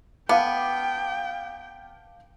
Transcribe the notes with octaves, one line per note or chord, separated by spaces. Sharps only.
B3 F5 G5 A5 D6